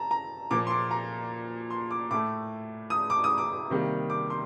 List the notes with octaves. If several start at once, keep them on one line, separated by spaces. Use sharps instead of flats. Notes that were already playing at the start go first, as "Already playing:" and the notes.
Already playing: A5 A#5
A#5
A#2 F3 A#3 D6
C6
D6
A#5
C6
D6
A2 A3 D6
D#6
D6
D#6
D6
C3 D#3 G3 A#3
D6
C6